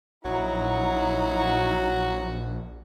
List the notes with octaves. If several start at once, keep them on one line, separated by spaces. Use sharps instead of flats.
A#1 F#3 D#4 E4 F#4